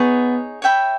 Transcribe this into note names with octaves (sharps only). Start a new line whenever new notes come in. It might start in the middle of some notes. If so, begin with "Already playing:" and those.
Already playing: B3 D#4 G#4 C#5
C#5 E5 G5 B5